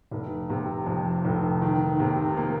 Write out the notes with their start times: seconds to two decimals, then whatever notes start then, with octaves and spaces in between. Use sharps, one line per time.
0.11 F1
0.50 C3
0.86 F2
1.25 F1
1.62 D#3
2.00 C3
2.37 A#3